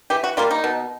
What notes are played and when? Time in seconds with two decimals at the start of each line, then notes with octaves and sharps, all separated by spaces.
0.10 E3 G4
0.24 F#4
0.37 G3 A#3 F4
0.51 D#4
0.64 B2